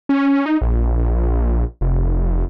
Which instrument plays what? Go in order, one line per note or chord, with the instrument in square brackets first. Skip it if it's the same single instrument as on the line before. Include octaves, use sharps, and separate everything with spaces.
[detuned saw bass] C#4
D#4
A#1
F1